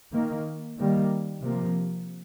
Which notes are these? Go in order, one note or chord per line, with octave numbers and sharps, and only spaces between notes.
D#3 A#3
D#3 G3 A#3
C3 F3 A#3